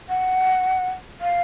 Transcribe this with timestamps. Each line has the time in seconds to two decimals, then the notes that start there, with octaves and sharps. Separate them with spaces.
0.09 F#5
1.21 F5